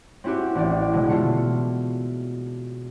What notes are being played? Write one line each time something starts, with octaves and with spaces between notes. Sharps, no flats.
C4 C#4 E4 F#4 G4
A1 D5
B2 D3 G#3
B2 A3 F4 C#7